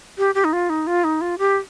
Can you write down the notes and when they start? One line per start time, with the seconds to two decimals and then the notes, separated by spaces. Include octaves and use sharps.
0.18 G4
0.35 G4
0.44 D#4
0.53 F4
0.70 D#4
0.87 F4
1.04 D#4
1.21 F4
1.39 G4